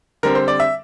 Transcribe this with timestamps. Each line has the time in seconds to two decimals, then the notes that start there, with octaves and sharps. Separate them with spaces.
0.23 D3 G3 C4 A#4
0.35 C5
0.48 D5
0.60 E5